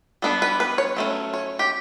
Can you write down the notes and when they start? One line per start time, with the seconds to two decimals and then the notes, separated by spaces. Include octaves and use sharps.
0.22 G3 B3 D4 A4
0.42 B4
0.60 B4
0.78 C#5
0.97 F#3 A3 C#4
1.34 C#5
1.59 G4